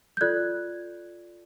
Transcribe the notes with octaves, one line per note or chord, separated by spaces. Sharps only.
G6
F4 A4 D5 F#6 G#6